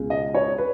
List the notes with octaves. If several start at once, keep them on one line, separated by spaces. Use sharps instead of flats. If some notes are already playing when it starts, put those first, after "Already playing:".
Already playing: C#2 B2 G#3
D#5
C#5
B4